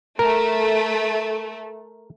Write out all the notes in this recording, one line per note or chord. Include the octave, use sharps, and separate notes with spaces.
A3 A#4